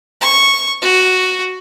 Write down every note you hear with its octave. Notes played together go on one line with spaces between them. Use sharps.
C#6
F#4